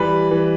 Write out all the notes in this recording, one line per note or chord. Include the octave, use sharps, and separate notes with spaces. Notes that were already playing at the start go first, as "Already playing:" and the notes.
Already playing: E3 G3 B4
E3